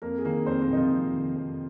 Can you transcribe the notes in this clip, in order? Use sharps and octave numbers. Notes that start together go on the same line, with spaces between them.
F2 A#3 A#4
G#4
D#3 A#3 A#4
F2 C4 C5
A#3 A#4
C3 D#4
F3 F4
F2
D#3
F2